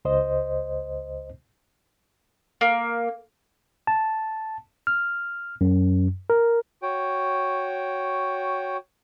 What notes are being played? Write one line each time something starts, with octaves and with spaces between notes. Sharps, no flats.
C#2 C5 D#5
A#3
A5
F6
F#2
A#4
F#4 C#5 G5